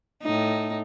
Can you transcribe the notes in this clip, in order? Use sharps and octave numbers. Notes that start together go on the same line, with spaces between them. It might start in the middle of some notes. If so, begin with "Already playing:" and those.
A2 D#4